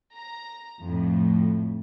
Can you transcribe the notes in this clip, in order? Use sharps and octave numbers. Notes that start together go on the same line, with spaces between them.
A#5
F2 A2